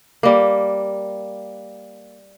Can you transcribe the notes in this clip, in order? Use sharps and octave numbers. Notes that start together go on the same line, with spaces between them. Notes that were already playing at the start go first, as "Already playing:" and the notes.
G3 A#3